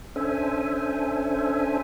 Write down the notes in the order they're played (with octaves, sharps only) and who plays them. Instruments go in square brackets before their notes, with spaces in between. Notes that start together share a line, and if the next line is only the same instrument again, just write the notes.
[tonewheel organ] C#4 D4 A4 C5 E5 G#5